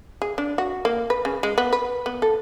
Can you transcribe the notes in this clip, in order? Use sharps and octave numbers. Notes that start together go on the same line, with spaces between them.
G#4
D4
F#4
A#3
B4
C#3
G#3
B3
B4
B3
A4